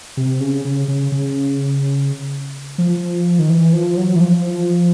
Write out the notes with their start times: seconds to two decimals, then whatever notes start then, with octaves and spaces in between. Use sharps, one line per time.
0.17 C3
0.40 C#3
0.65 C#3
0.88 C#3
1.12 C#3
2.78 F3
3.39 D#3
3.50 E3
3.73 F3
3.97 F#3
4.16 E3
4.20 F3